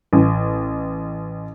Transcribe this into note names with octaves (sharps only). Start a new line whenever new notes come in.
A1